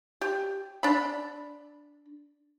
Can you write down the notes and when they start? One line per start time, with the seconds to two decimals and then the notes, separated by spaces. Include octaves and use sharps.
0.21 G4
0.83 D4 B5